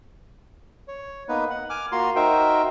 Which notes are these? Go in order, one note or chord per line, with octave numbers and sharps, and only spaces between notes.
C#5
A#3 B3 D#4 B4
F#5
G#5 D6 F6
A#3 F4 F#4 A#5 C6
D#4 F#4 A#4 C5 E5 G5